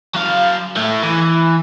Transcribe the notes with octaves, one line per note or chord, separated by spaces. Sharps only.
F#3 F5
A3 E4
E3